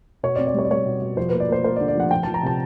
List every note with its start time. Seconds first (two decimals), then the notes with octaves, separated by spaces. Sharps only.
0.23 B2 C#5
0.36 D5
0.38 C4
0.47 D5
0.54 G3 C#5
0.65 D5
0.71 G3 C#5
0.86 B2
1.02 B2
1.17 F3 C5
1.29 A#3 B4
1.40 D5
1.48 A#3 C5
1.64 A#3 C5
1.76 D5
1.80 D3
1.88 D5
1.95 F3 F#5
2.11 F3 G5
2.23 F3 A5
2.34 A#5
2.43 C3 A5